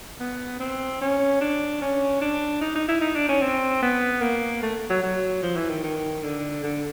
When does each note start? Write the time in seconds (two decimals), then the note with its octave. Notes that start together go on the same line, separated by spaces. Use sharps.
0.20 B3
0.60 C4
1.01 C#4
1.41 D4
1.81 C#4
2.21 D4
2.61 D#4
2.75 D#4
2.89 E4
3.01 D#4
3.16 D4
3.29 C#4
3.42 C4
3.82 B3
4.22 A#3
4.62 A3
4.90 F#3
5.02 F#3
5.43 F3
5.56 E3
5.70 D#3
5.83 D#3
6.23 D3
6.64 D3